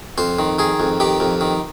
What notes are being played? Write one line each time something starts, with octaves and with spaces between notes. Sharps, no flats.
F2 C5
D#3
D#3 G#4
F2
D#3 G4
F2
D#3